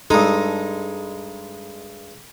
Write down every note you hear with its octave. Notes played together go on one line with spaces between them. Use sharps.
G2 G#3 D#4 A4